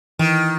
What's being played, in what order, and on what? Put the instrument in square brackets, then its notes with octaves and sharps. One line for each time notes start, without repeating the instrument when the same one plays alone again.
[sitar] D#3 [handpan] E3